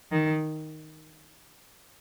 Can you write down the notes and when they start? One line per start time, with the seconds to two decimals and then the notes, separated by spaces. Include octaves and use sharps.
0.11 D#3